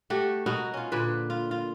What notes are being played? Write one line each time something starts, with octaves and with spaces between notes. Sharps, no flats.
A3 F#4 G4
B2 D#4 F#4 A#4
C#4 F4
A#2 D3 B4
F4
F4